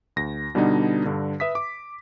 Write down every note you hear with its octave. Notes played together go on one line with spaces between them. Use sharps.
D2 A#6
B2 D3 G3 B3 D4 D#4
G2 D3
B4 E5 D#6 B6
D6